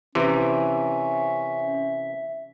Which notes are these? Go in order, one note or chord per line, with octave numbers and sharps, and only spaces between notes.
C3 E3 C#4 E5